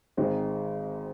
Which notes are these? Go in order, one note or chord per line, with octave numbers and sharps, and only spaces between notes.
G#1 G#2 D#3 G#3 C4